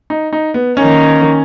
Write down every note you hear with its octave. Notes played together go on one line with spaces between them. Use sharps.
D#4
D#4
B3
D#3 A#3 C#4 D#4